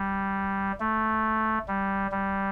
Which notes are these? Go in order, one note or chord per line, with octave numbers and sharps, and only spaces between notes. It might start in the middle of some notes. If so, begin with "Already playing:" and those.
Already playing: G3
A3
G3
G3